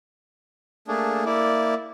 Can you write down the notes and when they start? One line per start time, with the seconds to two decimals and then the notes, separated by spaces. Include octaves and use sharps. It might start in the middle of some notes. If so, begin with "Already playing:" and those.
0.88 A3 A#3 D4 G#4
1.26 A#3 E4 D5